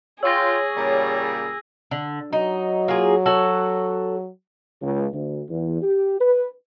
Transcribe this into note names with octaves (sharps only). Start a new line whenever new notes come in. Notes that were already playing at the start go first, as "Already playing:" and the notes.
F4 G#4 C#5 G5 E6 A#6
A#2 C#3 G3
D3
F#3 D#4
A#3 F4 G#4
F#4 A4 C#5
C#2
D2
E2
G4
B4